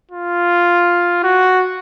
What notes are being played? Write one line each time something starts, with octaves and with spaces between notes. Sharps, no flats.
F4
F#4